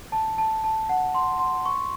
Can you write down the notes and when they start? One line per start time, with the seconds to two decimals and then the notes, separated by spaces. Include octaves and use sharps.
0.12 A5
0.38 A5
0.64 A5
0.89 F#5
1.14 C6
1.39 C6
1.65 C#6